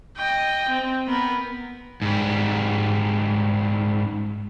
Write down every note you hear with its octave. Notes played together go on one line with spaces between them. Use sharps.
D#5 G5
C4
B3 A#4
G#2 G3